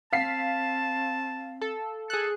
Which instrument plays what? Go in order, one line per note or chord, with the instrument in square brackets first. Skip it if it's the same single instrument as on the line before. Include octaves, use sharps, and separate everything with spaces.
[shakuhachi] C4 [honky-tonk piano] F5 B6 C7 [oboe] A5
[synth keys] A4
[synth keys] G#4 F#6 [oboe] A4